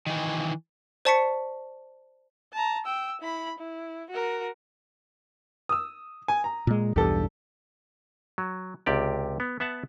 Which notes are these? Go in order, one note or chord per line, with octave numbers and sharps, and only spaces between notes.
D#3 E3
C5 D5 A5 C#6 B6 C#7
A5 A#5
G5 E6
E4 B5
E4
F#4 A#4
D#6 E6
G#5
A#5
A#2 G#3
B1 E2 G2 G4 A4
F#3
C#2 C3 G4 D5
B3
B3 E5 F#5 A5